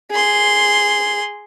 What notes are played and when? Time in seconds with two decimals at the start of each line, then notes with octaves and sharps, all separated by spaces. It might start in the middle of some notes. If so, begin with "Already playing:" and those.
0.11 G#4 C6